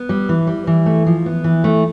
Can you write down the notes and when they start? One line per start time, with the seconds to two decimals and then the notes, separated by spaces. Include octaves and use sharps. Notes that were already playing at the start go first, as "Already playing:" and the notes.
Already playing: B3
0.09 G3
0.29 E3
0.47 G3
0.67 E3
0.86 A3
1.06 F3
1.26 B3
1.44 E3
1.64 A3